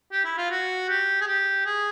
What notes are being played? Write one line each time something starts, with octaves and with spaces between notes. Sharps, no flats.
G4
E4
F4
F#4
G4
G#4
G4
G#4